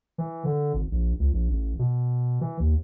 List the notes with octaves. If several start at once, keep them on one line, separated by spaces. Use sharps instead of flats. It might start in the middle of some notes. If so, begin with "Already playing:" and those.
E3
D3
G#1
A#1
C#2
A#1
A1
B2
E3
D#2